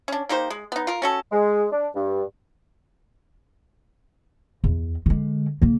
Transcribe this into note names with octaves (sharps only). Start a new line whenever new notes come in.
C#4 D4
A#3 D#4 G4 C5
G#3
B3 D#4
F4 A#4
C#4 F#4 A4
G#3
D4
G2
E2
D3 G#3
C#3 A#3